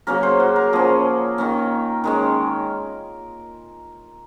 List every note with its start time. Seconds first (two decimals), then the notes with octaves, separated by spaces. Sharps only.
0.07 C#3 F#3 A#3 C#4 A#4
0.23 C5
0.40 F#4
0.56 A#4
0.73 F3 A#3 C#4 G#4
1.38 D#3 A#3 C#4
2.04 D#3 G#3 C#4 A#4